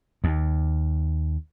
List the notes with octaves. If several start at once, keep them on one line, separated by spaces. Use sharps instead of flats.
D#2